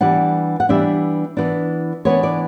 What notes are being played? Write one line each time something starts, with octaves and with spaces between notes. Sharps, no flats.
E3 G3 B3 D4 F#5
F#5
E3 G3 B3 D4 E5
E3 B3 D4
E3 B3 D4 C#5
D5